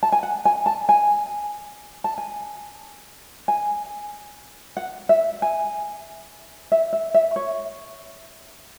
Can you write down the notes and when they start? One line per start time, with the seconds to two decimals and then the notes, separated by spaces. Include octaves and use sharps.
0.03 A5
0.12 G#5
0.23 F#5
0.45 G#5
0.66 A5
0.89 G#5
2.04 A5
2.18 G#5
3.48 G#5
4.77 F#5
5.09 E5
5.42 G#5
6.72 E5
6.93 E5
7.14 E5
7.36 C#5